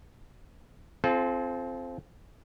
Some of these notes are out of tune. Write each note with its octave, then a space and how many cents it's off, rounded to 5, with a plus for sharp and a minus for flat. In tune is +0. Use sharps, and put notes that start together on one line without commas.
C4 +0 F4 -20 A4 -40